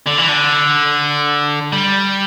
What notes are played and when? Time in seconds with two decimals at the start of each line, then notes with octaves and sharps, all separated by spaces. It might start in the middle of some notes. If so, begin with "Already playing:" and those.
0.06 D3
0.18 E3
0.28 D3
1.73 G3